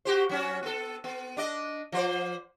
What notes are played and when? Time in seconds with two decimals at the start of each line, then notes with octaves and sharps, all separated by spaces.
0.05 F#4 G4 C5
0.29 F#3 C#4 F#4
0.63 B3 A4
1.04 B3
1.37 D4 D5 D#5
1.92 F3 C5 D5